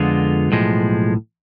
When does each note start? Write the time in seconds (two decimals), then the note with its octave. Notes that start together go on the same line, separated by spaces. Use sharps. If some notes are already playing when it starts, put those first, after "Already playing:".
Already playing: F2 D3 G#3 B3 F4
0.50 B1 A2 F3 G#3